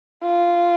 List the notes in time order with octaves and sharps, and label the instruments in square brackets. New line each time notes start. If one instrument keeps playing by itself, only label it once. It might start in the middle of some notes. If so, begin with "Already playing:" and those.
[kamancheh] F4